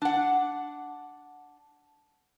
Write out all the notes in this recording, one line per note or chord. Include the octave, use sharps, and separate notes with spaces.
D4 F#5